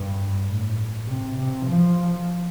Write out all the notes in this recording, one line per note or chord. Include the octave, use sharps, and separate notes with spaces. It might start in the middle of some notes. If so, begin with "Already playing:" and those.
Already playing: G2
A2
C3
C3
F3